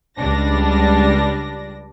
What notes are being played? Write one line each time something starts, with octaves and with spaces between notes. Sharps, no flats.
C#2 G3 D4 A#6